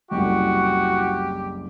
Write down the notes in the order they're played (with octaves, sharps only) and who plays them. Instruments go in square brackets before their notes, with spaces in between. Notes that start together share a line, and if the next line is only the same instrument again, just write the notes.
[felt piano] F#1 C2 [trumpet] F#4 [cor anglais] G4